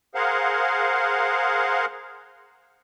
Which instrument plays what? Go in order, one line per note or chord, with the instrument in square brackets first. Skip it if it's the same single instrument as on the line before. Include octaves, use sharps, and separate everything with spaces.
[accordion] G#4 A#4 C5 F5 F#5